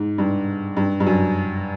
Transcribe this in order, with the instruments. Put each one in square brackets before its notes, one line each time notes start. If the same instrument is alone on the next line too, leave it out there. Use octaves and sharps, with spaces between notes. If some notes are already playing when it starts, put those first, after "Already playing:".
Already playing: [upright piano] G#2
G2
G2
G2
F#2